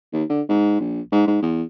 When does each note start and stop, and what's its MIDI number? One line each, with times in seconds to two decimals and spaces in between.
0.12 0.23 39
0.29 0.41 50
0.49 0.77 44
0.80 1.00 34
1.12 1.22 44
1.27 1.38 44
1.42 1.63 40